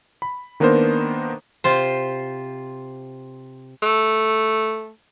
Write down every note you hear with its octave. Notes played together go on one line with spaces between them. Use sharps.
B5
D#3 A#3 B3 D4 A#4 C5
C3 F4 C5
A3